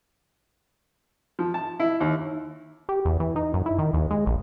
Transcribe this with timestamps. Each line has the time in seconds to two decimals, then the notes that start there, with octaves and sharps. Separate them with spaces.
1.39 F3
1.54 A5
1.80 E4
2.01 D#2
2.89 G4
3.05 E2
3.20 E3
3.36 D#4
3.54 F#2
3.66 E4
3.79 D#3
3.93 D#2
4.11 G#3
4.26 A#1